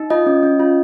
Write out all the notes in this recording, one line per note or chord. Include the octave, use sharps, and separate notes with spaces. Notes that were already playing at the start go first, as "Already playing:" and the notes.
Already playing: D#4
F4 D#5
C#4
C#4
F4